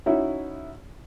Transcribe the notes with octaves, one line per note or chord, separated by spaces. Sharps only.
C#4 D#4 E4 F#4